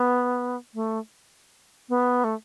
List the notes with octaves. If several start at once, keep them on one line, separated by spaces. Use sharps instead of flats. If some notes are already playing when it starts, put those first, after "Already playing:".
Already playing: B3
A3
B3
A3